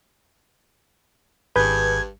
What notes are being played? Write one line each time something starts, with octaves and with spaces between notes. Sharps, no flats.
G#1 G2 G#4 B4 G6 G#6